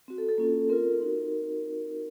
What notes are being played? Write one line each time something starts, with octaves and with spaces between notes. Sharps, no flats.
C4 F#4
A4
A4
A#3 C#4 F4
C4 F4 A#4
C4 D#4 F#4